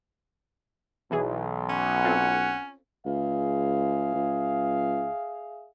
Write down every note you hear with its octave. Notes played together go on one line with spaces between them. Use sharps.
B1 B2 E3 G#4
C#4 F#5
C4 F4 A4
C#2 G#4 E5 F5
C#2